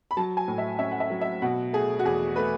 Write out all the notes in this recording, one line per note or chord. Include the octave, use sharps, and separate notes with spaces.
B5
F#3 A5
G#5
A2
E5
C#4 E5
F#5
E5
F#3
E5
B2 F#5
A3 G#4
F#4
E2 G#4
A3 B4